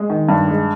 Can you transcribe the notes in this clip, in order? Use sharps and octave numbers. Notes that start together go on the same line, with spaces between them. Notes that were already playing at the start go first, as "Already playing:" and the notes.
Already playing: G#3
D#3
G2
G#3